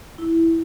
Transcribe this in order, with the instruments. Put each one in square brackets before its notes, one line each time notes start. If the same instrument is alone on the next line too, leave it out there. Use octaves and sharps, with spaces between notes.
[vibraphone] E4